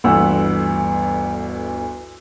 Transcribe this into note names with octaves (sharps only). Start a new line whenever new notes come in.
G1 D2 E3 F#5 E6